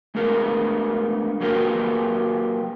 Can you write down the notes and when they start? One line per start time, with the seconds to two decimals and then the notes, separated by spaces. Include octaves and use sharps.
0.15 G#3 A3 B3 D4 A#4
1.40 F#3 A#3 F#4 G4 A#4 B4